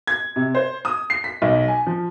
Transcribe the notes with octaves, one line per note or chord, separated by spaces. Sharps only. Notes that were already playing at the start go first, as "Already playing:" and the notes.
G#6
C3
C5
D#6
C7
B6
B1
G#5
F3